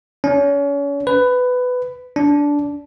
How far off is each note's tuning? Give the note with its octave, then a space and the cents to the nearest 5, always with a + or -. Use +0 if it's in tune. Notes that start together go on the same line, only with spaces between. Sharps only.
C#4 +35
B4 +15
D4 -15